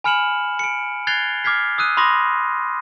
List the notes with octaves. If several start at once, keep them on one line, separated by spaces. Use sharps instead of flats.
G#5 B5 F6 C#7 E7 F#7
C#7 D7
F#6 G#6 A6 C7 F7 G7
D6 F6 G#6 B6 C7
D#6 E6 F#6 D#7
B5 C6 D6 D#6 A#6